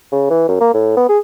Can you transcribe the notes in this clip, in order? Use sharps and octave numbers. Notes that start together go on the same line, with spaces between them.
C#3
E3
F#2
A#3
A2
B3
G#4